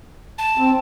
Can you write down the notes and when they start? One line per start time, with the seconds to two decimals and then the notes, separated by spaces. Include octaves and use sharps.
0.38 A5
0.58 C4